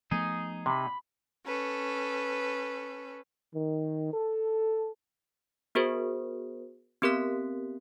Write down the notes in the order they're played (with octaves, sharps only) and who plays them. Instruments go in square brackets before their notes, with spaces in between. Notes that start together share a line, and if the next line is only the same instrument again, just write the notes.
[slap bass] F3 A3 B3 [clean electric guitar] D#4 G#4
[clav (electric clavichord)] C3 [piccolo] B5
[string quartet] C#4 A4 B4
[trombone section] D#3
A4
[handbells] B3 F#4 G#4 A#4 C5
B3 C4 G4 A#4 F#6 B6